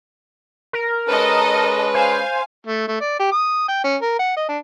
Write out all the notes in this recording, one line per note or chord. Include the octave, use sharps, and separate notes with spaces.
A#4
G#3 C#4 A4 B4 D#5
C5 F5 G#5
A3
A3
D5
G4
D#6
G5
C#4
A#4
F#5
D#5
D4